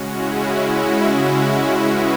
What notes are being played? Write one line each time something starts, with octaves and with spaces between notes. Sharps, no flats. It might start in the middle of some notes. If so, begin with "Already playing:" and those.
Already playing: C#3 G#3 C#4 F#4
E4
F#4
B4